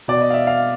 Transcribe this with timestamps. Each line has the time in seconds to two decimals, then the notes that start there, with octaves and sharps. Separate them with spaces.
0.08 B2 D5
0.22 D#5
0.30 F5
0.34 E5
0.47 F5